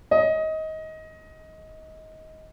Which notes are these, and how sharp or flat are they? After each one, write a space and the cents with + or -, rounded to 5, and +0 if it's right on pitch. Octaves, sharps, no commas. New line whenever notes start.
D#5 +20